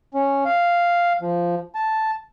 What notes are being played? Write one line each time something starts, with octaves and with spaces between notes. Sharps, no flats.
C#4
F5
F3
A5